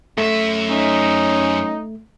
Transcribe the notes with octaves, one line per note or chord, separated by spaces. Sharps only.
F#2 A3 E5
C#4 D#4